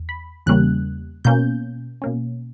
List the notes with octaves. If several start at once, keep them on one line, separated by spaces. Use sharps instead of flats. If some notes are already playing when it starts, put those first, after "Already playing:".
Already playing: E2
B5
E2 C#3 G3 A#3 C#4 F#6
B2 A#3 C#4 G6
B2 A#3 C#4